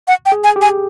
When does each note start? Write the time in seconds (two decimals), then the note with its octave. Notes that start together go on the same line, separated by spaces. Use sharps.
0.08 F#5
0.26 G5
0.32 G#4
0.44 G#5
0.56 G4
0.62 G#5